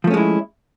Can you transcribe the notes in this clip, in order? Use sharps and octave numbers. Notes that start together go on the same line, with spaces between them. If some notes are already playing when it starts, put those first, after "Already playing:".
F3 G#3 A3 C#4 E4